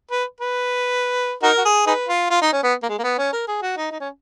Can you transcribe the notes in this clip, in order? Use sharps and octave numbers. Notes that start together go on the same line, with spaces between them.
B4
B4
D#4 F#4 A#4
F#4
G#4
D#4 G#4 B4
F4
F4
D#4
C#4
B3
A#3
G#3
A#3
B3
C#4
A#4
G#4
F#4
D#4
D#4
C#4